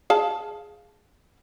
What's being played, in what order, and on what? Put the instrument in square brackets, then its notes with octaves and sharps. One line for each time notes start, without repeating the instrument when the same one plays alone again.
[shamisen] G#4 F5 A5